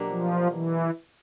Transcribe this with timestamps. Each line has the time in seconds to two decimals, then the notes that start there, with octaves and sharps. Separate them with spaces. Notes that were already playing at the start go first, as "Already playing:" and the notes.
Already playing: B2 F#3 A#3 D4 G4
0.09 F3
0.52 E3